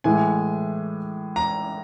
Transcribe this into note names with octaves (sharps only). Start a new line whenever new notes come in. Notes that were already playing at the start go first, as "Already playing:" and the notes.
A2 E3 G#3 G#5
A#5